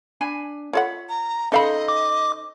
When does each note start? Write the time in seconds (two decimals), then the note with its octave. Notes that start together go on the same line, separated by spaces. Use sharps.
0.21 D4 G#5 B5
0.73 F4 A4 C#5 F#5 B5
1.09 A#5
1.52 C#3 D#4 A4 C5 D#5 F5 B5
1.88 D6